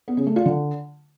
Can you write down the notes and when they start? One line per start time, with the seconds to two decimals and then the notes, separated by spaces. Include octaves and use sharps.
0.08 B3
0.17 C#3
0.27 A3
0.36 F4
0.46 D3